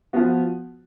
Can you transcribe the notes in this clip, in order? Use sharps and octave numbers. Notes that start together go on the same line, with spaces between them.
F3 B3 F#4